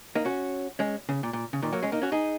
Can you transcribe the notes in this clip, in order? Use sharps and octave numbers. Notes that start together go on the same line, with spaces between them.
A#3 D#4
C#4 F#4
G#3 C#4
C#3
A#2
A#2
C#3
A#2 D#3
F#3 A#3
G#3 C#4
A#3 D#4
C#4 F#4
D#4 G#4